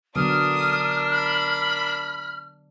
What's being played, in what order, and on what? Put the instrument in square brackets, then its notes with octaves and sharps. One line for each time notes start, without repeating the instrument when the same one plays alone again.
[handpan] D3 F#3 B3 [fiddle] D4 A#4 [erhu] D#6 [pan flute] F6
[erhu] B5